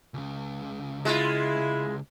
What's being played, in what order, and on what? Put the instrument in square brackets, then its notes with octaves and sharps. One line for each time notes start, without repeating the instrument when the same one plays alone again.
[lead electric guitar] C#2 C#3
[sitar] G#3 F4 [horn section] E4